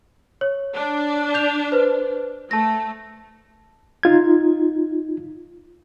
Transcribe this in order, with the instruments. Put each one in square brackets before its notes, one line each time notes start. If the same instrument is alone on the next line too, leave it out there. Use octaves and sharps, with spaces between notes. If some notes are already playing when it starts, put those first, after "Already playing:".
[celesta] C#5
[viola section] D4
[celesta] G6 F7
B4 C5
[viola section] A3 [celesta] A5 A#6
[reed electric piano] D#4 F4 G#6